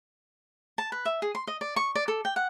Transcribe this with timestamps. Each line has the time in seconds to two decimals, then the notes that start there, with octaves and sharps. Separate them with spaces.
0.78 A5
0.92 B4
1.05 E5
1.22 G#4
1.35 C6
1.47 D#5
1.61 D5
1.76 C#6
1.95 D5
2.08 A4
2.25 G5
2.36 F#5